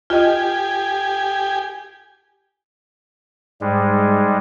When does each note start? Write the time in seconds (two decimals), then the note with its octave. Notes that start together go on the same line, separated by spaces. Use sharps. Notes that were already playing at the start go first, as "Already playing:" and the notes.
0.10 F4 G4 D#5 G#5
3.61 G#2 G3 G#3